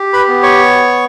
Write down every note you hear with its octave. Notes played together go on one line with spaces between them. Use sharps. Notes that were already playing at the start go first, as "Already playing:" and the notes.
Already playing: G4
B4 B5
B3
C#5 C#6